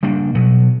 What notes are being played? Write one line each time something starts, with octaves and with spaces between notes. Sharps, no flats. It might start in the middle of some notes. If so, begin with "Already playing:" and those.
C#3 G3 A#3 D4
B2 F#3 B3